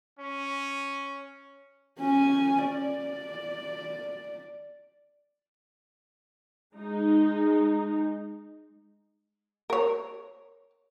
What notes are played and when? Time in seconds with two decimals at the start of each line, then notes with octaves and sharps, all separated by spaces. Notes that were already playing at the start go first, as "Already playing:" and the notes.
0.19 C#4
2.00 C#4 G#5
2.66 D5
6.76 G#3 D#4
9.70 A#4 C#5